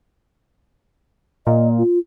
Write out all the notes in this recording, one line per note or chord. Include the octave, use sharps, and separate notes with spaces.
A#2 D#5
F4